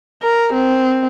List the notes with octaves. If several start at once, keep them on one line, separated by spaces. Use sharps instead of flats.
A#4
C4